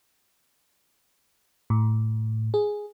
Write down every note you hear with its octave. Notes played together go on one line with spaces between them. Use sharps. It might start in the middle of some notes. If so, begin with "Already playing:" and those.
A2
G#4